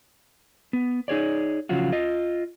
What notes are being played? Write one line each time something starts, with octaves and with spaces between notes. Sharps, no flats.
B3
D#4 G#4 C#5 D5
C#3 F3 F#3 F4 F#4
F4 D#5